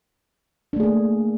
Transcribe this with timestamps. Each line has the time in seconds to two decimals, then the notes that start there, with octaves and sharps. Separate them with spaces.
0.73 D4
0.76 A3
0.80 G#4
0.83 A#3